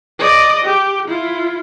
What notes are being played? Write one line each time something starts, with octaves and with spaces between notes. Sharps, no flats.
D5 D#5
G4
E4 F4